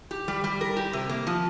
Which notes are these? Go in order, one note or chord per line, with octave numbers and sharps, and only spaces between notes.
G4
G3
G3
A#4
G4
C3
A#3
F3